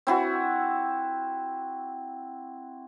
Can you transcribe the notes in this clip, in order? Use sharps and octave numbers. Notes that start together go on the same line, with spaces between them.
C4 E4 F#4